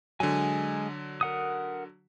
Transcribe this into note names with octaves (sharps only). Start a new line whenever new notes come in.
D3 F#3 G#3 G#5
A#4 F#5 D#6